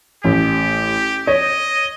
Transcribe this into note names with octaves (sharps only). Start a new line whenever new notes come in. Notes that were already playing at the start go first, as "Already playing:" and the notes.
A1 G4
C#5 D#5